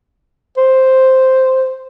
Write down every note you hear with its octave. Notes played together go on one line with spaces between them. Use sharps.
C5